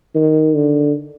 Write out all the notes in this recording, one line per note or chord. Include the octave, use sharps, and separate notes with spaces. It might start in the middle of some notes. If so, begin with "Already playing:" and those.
D#3
D3